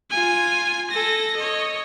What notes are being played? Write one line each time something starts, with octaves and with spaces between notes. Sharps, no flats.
F4 G#5
A4 A#6
C#5 D#5